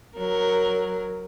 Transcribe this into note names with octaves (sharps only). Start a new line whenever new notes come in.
F#3 A#4